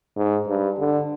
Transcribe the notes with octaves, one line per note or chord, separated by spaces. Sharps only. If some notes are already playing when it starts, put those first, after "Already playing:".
G#2
G2
D3